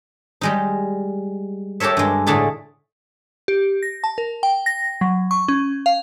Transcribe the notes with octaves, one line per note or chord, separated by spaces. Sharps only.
G3 G#3 D#4
G4 A4 A#4 C#5 E5
G2 G#3
A2 D3 A3 G#4 D5
G4
A#6
A5
A#4
G5
A#6
F#3
C#6
C#4
F5